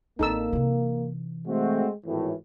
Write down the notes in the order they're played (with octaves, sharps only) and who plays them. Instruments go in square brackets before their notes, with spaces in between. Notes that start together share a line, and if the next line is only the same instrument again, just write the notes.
[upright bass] A1 C4 [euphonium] A#3 [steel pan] D#4 A4 E6
[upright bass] C3 E3
[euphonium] G#3 [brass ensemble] A3 C4 F#4
[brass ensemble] G#1 A2 [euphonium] E3